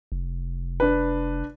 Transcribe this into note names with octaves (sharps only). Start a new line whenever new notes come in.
F1
D4 B4